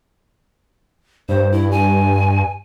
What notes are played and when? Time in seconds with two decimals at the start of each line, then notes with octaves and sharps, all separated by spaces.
1.29 G2 C5
1.52 E4
1.71 G#5